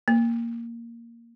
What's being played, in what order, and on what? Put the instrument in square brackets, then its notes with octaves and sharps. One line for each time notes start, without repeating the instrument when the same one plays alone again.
[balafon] A#3